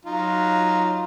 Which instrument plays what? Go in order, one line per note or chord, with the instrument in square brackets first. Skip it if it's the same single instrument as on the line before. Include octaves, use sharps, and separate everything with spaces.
[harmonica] F#3 D#4 F4